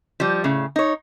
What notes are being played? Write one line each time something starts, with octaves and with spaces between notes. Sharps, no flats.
F3 G3
A2 C#3
D#4 C#5